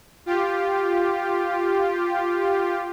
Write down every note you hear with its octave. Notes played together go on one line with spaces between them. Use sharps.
F4 G4